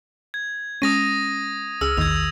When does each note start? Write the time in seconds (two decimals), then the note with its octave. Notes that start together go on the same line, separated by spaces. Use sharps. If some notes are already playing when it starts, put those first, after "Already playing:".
0.34 G#6
0.82 G#3 C#4 D#6 A#6 D#7
1.81 C#2 G#4 E6 F6
1.97 A#1 E2 D#3 G#6 F7